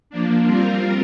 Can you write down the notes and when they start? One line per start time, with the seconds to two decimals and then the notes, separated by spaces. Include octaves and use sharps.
0.10 F3 A#3 D4
0.45 G3 C4 F4 A#4